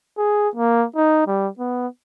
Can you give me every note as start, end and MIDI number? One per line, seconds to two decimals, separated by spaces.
0.18 0.49 68
0.55 0.86 58
0.96 1.25 63
1.27 1.49 55
1.59 1.87 59